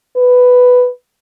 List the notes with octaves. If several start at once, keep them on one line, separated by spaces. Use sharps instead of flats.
B4